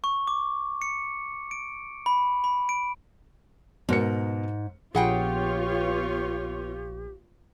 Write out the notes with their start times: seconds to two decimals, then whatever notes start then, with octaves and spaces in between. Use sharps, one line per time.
0.04 C#6
0.27 D6
0.82 C#7
1.51 D7
2.06 B5
2.44 B5
2.69 D7
3.89 G#2 B2 A#4 C#7
4.95 A#1 B3 F4 G4 G#4 C#5 F#5 G5